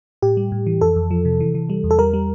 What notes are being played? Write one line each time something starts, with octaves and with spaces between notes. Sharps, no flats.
A2 G4
G3
A2
E3
F2 A4
F2
F3
C3
E3
E3
G3
E2
A4
G3 A#4
G3